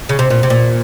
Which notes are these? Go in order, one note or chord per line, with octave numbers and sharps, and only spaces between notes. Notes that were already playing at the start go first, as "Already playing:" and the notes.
C#3
C3
A#2
C3
A#2